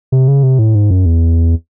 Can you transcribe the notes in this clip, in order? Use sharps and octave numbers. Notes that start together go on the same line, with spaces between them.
C3
C#3
C3
A2
G#2
F#2
E2